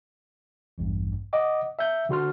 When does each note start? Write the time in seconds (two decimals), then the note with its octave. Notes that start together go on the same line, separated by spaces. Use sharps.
0.78 A1 E2 G2
1.33 D#5 F#5 D6 D#6
1.79 E5 G6
2.09 D3 F#4 C6 F6